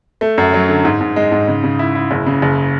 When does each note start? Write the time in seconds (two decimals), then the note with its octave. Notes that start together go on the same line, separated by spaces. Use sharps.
0.21 A3
0.38 F#2
0.53 F#3
0.69 D3
0.85 G#2
1.01 G#2
1.16 G#3
1.32 G#2
1.48 C#3
1.64 C#3
1.79 E4
1.95 E4
2.11 F#1
2.26 C#3
2.42 F#1